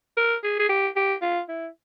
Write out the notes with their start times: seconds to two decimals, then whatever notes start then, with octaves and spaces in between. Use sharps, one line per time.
0.17 A#4
0.44 G#4
0.59 G#4
0.69 G4
0.96 G4
1.22 F4
1.48 E4